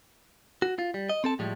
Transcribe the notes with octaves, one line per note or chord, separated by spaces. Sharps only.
F#4
F4
G3
D#5
C4 A4 A5
A2 F3 G3 G#3